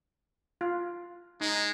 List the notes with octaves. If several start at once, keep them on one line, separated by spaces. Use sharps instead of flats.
F4
G#3 D#4